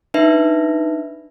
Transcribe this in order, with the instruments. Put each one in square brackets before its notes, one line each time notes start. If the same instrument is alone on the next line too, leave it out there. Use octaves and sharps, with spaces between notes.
[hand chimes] D4 D#4 B4 E5